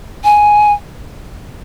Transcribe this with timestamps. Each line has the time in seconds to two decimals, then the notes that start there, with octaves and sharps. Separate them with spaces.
0.24 G#5